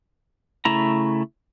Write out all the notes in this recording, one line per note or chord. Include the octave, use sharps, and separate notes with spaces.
C#3 A3 E4 A#5